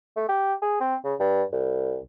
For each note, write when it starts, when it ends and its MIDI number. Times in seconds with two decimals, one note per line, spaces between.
0.16 0.27 57
0.29 0.54 67
0.62 0.79 68
0.81 0.95 60
1.04 1.14 49
1.20 1.43 43
1.53 1.99 36